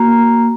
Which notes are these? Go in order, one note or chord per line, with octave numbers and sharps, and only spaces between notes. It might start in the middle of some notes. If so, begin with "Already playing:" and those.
Already playing: A#3 F#4 A#5